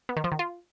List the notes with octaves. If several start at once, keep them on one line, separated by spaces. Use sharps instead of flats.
B3
D#3
F3
D#3
F4